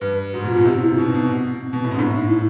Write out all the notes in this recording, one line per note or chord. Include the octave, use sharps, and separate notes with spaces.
G2 B4
G#2 F#4
A#2
B2 F4
C3 G4
E4
B2 D#4
B2
B3
B3
C4
B2
C4
A2
G#2
A2 D4
D#4
E4